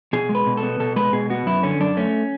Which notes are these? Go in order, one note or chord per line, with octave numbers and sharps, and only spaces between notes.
B2 G#4
G#3
B4
B2
A4
B3
B2 A4
G#3 B4
B2 G#4
B3 F#4
F#2 E4
D3 C#4
F#2 D4
A3 C#4